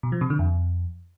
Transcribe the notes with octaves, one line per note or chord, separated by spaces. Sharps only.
B2
F3
C3
D3
F2